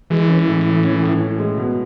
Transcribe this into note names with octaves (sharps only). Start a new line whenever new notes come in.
E3 G#3
C#4
A2
A2
C#4
A2
C#4
G#3
B2